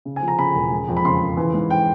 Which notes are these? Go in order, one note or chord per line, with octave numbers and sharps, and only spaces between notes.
C#3
G#5
F3
A#5
C#3 B5
E1
G#3
F2
B5
C#3 C6
C#3
E3
G#2
G5